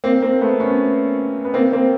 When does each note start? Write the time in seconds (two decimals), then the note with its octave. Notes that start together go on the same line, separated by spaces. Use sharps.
0.04 A#3 C4
0.22 A#3 C4
0.41 A3 B3
0.60 B3 C#4
1.45 B3
1.54 A#3 C4
1.73 A#3 C4